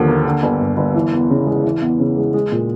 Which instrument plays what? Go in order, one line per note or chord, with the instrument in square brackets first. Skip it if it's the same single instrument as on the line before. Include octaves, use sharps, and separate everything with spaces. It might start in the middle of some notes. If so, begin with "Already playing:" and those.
Already playing: [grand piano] D#2 D3 F3
A#3
D3
G1
G2
G1
E3
E2
C#3
G#3
E3
E2
C#3
G#3
G#3
A#2